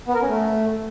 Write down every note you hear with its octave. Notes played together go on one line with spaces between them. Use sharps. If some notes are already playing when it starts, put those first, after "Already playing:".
B3
A#4
C#4
A3